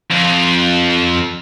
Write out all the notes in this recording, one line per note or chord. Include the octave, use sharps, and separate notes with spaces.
F2